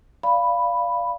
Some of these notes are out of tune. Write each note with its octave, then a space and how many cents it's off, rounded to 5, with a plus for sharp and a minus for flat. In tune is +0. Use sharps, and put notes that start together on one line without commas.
D5 +0 F5 -10 B5 +0